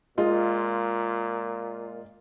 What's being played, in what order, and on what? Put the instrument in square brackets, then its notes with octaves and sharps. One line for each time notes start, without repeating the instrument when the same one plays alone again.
[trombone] A#2 [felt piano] G#3 F4 D#5